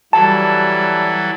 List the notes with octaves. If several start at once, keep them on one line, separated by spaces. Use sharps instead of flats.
E3 F#3 G3 A4 A5